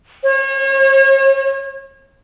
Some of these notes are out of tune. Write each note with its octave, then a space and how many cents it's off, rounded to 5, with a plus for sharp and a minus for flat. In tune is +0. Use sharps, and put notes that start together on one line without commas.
C#5 -40